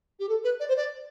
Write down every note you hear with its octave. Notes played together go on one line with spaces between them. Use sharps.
G4
A4
B4
D5
C5
D5